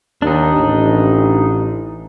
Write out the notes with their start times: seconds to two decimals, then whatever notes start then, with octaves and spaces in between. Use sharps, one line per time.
0.22 D#2 D4 D#4
0.57 A1